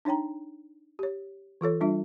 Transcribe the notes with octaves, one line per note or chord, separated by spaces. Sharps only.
D4 D#4 C#5 G5 A#5
G4 C#5
E3 F4 A4 C#5
G3 D4 F4 E5